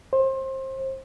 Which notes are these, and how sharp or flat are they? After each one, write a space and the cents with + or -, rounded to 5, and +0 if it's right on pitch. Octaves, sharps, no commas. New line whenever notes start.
C5 +25